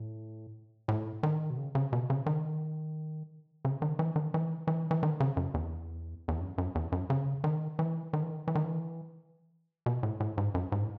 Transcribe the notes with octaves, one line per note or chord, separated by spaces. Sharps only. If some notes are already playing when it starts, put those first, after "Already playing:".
Already playing: A2
A2
D#3
B2
C#3
C#3
B2
C#3
D#3
C#3
D#3
E3
D#3
E3
E3
E3
D#3
C#3
F#2
E2
E2
F#2
F#2
E2
F#2
C#3
D#3
E3
D#3
E3
D#3
E3
D#3
E3
B2
A2
A2
G#2
F#2
G#2
A2